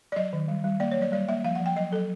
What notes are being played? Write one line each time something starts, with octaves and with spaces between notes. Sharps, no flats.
D5
F#3 D#5
D#3
G3
G3
A#3 D5
C#5
F#3 D5
G3 D5
A#3 E5
F3 F5
F3 F#5
G5
F#3 D#5
F#3 A4